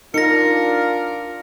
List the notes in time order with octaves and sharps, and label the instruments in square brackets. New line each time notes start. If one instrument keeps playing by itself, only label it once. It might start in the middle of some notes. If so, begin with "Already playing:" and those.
[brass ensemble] D4 F4 [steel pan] D#4 [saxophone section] A#4 [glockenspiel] A#6 C#7